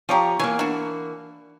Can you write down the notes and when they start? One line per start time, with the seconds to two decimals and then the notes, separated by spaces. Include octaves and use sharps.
0.09 F3 F4 G4 C#5 A#5
0.39 E3 A#3 C#5 G#5
0.59 D4 F#4